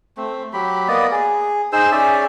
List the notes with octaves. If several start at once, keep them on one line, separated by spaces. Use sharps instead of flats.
A3 C4
F#3 G4 B5
A#3 B3 D5 D#5
G#4
D#4 G#4 C5 E6
C#4 G#4 D5 E5